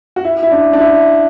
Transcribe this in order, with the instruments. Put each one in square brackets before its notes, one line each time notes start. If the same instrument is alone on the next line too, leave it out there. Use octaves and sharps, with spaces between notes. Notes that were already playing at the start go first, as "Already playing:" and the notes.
[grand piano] F#4
E4
E4
D4
D4
E4